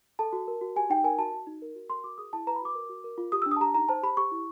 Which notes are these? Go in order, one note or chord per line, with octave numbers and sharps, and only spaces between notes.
A4 A5
F#4
A#4
F#4
G4 G#5
D#4 G5
A#4 G#5
F#4 A5
F#4
D#4
A#4
F#4
A#4 C6
F#4 D6
G#4 D#6
E4 A5
B4 A#5
B5
F#4 D6
A#4
F#4
A#4
F4
G4 D#6
D4 E6
D#6
A5
G4 A#5
D#4 A#5
C5 A5
G4 B5
G4 C#6
E4